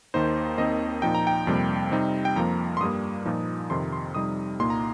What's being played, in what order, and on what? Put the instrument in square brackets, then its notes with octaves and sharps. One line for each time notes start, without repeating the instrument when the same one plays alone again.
[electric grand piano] D#2 D#3 A#3 D#4 C5
D#2 D#3 C4 D#4 D#5
A#2 F3 D#4 G5
A#5
G5
F2 C3 G3 A#3
C3 G3 C4 D#4
G5
F2 F3 A#3 A#5
C6
G2 G3 A#3 D#6
A#2 F3 D#4
F2 C3 D#3 C6
C6
F2 C3 G3 D#4 D#6
C2 A#2 A#3 D#4 C6
A#5